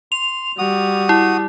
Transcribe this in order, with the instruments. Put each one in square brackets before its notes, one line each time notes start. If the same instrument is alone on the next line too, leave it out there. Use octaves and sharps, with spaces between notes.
[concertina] C6 [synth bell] F7
[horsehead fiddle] G3 [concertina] F#4 D#6
[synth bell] E4